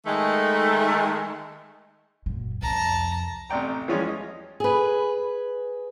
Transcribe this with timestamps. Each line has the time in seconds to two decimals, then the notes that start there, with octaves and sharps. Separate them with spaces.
0.05 D#3 G#3 A3
2.26 F#2 A#2
2.62 C2 F2 A5 A#5
3.50 A1 C3 D5 G5 A#5
3.88 E3 F3 G3 G#3 C#4 F4
4.07 D#5
4.60 G#4 B4